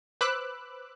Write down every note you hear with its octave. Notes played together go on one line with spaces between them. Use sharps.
B4 C5 B5 D6 E6 F#6